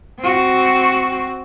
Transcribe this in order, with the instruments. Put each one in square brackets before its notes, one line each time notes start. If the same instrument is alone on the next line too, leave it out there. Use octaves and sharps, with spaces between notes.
[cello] C4 F#4